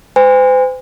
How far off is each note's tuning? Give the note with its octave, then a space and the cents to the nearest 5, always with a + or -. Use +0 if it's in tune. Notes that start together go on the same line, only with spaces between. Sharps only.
C5 -40 G#5 -40